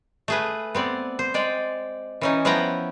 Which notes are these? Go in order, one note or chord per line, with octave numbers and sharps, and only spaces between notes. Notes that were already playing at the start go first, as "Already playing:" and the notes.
A3 G#4 B4
B3 C4 D5
C5
G#3 D5 G5
E3 C#4 D#4
F3 B3 E4 B4 G5 A#5